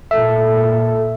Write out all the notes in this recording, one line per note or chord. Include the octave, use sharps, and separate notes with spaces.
A#2 A4 E5